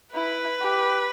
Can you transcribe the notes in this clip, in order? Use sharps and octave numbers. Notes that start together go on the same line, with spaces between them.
E4 B4
G4